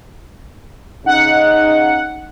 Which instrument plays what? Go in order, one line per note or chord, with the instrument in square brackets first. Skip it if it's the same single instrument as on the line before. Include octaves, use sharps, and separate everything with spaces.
[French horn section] C#3 D#4 [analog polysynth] F#5